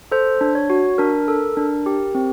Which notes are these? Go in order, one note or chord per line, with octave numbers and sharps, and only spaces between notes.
A4 C5
D4
C#5
F#4
D4 A#4
A4
D4
G4
C4